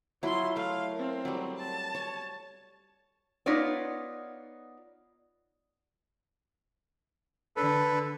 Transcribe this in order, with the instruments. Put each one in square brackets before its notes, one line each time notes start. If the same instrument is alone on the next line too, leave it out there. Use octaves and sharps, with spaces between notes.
[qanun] F#3 E4 [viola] F4 C6
[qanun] A3 [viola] F5
[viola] C4 A#4
[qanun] F#3 G3
[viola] A5
[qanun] C#5
[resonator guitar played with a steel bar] B3 D#4 F4 C#5 D5
[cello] D3 [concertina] A4 B4